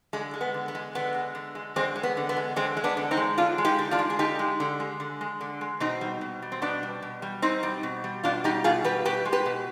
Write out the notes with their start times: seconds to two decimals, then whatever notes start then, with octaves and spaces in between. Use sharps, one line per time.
0.13 D3 G#3
0.34 G#3
0.41 B3
0.54 D3
0.68 B3
0.75 G#3
0.95 D3 B3
1.14 G#3
1.35 D3
1.55 G#3
1.76 D3 G#3 C4
1.96 G#3
2.03 B3
2.17 D3
2.29 B3
2.37 G#3
2.56 D3 G#3 C4
2.77 G#3
2.84 B3 D4
2.97 D3
3.11 C4 D#4
3.17 G#3
3.38 D3 D4 F4
3.58 G#3
3.65 D#4 G4
3.79 D3
3.91 D4 F4
3.99 G#3
4.10 G#4
4.19 D3 D#4 G4
4.39 G#3
4.60 D3
4.80 G#3
5.00 D3
5.21 G#3
5.41 D3
5.61 G#3
5.80 B2 C4 D#4
6.01 G3
6.21 B2
6.42 G3
6.52 C4
6.62 B2 B3 D4
6.83 G3
7.02 B2
7.22 G3
7.42 B2 C4 D#4
7.63 G3
7.83 B2
8.04 G3
8.24 B2 D4 F4
8.44 G3 D#4 G4
8.64 B2 F4 G#4
8.84 G3 G4 B4
9.05 B2 G4 B4
9.25 G#3
9.32 G4 B4
9.46 B2